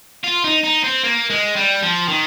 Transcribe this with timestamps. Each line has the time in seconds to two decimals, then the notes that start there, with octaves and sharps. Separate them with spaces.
0.24 F4
0.44 D#4
0.63 D#4
0.83 C4
1.03 A#3
1.30 G#3
1.56 G3
1.83 F3
2.09 D#3